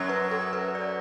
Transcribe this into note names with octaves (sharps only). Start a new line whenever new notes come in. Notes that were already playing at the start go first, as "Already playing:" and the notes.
Already playing: F#2 F#3
B4
A4
B4
D5